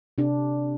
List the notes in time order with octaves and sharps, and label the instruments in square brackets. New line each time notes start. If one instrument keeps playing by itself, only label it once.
[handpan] C3 D4